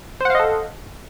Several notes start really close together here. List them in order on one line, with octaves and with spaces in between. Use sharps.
C5 F#5 F5 D#5 A4